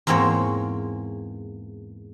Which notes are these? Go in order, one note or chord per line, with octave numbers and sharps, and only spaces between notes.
E2 G#2 A#3 C4 C#5